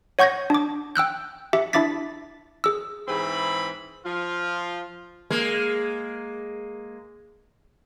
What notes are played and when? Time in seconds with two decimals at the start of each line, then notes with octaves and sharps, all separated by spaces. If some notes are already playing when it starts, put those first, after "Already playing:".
0.19 C#5 F#5 C#6 G6 G#6 A#6
0.50 D4 D6
0.96 G5 E6 F#6 G6
1.53 G4 E5
1.73 D4 E4 E5 D6 A6 B6
2.64 G#4 E6
3.08 G#2 E3 C4 G#4 B5
4.06 F3 F4
5.30 G#3 A#3